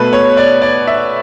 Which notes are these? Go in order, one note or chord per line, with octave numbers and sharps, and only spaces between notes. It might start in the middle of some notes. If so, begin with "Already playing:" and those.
Already playing: B2 A3 B4
C#5
D5
D5
E5